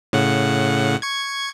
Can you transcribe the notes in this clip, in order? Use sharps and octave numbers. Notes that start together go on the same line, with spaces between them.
A2 C#3 F#5
C#6 G#6